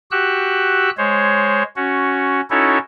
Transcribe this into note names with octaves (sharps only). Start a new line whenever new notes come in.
F#4 G4 E6 F#6
G#3 C5 C#5
C#4 F#4
C#4 D#4 E4 F#4 A4 C#5